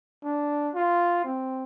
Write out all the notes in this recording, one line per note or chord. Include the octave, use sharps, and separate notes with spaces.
D4
F4
C4